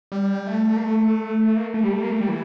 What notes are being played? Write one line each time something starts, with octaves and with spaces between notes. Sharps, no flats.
G3
A3
A#3
A3
A#3
A3
G3
A3
A#3
A3
G3
E3